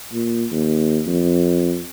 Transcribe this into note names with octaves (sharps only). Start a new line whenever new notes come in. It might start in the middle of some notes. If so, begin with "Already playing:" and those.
A#2
D#2
F2